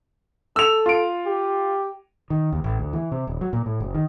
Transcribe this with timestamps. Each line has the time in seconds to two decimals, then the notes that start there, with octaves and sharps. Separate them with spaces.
0.56 A4 E6 F7
0.86 F4 D7
1.26 G4
2.30 D#3
2.53 D#2
2.64 A1
2.79 D2
2.93 E3
3.12 C3
3.27 D#1
3.41 F#3
3.53 A#2
3.66 A2
3.80 F#1
3.95 D#3